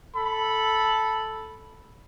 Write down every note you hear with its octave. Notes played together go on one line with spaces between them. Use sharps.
A4 B5